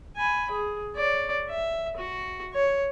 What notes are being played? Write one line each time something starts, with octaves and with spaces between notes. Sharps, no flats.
G#5 B5
G#4
C#5 D5
E5
F#4
C#5